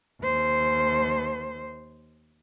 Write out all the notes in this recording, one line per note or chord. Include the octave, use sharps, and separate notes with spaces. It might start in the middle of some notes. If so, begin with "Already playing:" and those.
D#2 C5